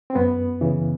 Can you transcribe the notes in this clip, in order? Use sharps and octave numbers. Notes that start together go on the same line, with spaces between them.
C4
F#2 B3
C#3 E3